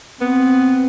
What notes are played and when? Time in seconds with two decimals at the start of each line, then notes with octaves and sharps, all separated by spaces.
0.21 B3 C4